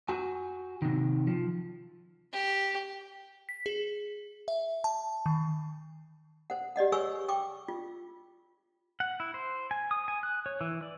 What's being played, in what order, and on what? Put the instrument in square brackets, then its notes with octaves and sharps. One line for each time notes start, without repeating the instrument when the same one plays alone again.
[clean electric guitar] F#4 G#5
C3 D#3
F3
[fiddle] G4
[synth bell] B6
G#4
E5
A5
D#3
[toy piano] C5 F#5
G4 D5 D#5 F#5
G#4 B4 C#5 G#5 C#6 E6
G5 C#6 D6
F4
[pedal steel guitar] F#5
E4
C5
G#5
D#6
G#5
F#6
C#5
E3
D5